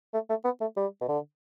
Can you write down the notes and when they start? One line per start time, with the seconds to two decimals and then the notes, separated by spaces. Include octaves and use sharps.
0.14 A3
0.29 A3
0.44 B3
0.61 A3
0.77 G3
1.01 B2
1.08 D3